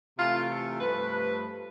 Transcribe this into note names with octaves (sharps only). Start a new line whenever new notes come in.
C3 E3 A3 F4
A4
G2 F3 A3 B4